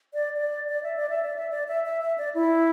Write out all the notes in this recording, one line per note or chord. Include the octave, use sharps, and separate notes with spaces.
D5
D5
D5
E5
D5
E5
D5
E5
D5
E5
E5
E5
D5
E4